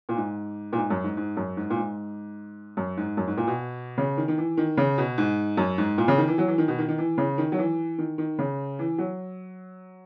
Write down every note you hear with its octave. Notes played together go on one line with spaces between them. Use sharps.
A#2
G#2
A#2
G#2
F#2
G#2
G#2
F#2
G#2
A#2
G#2
F#2
G#2
F#2
G#2
A#2
B2
C#3
D#3
D#3
E3
D#3
C#3
B2
G#2
F#2
G#2
A#2
C#3
D#3
E3
F#3
E3
D#3
B2
D#3
D#3
E3
C#3
D#3
F#3
E3
D#3
D#3
C#3
E3
F#3